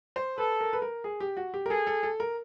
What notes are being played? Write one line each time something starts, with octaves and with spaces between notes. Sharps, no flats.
C5
A4 B4
A#4
B4
A#4
G#4
G4
F#4
G4
A#4
G#4 A4
A4
A4
A#4